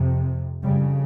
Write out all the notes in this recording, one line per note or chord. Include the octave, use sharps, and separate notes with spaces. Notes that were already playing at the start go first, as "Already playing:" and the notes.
Already playing: F2 C3
F2 C#3 G3